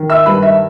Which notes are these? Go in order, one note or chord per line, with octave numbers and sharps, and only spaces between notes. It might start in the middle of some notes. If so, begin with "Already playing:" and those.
Already playing: D#3
E5 E6
G2 B4 B5
E5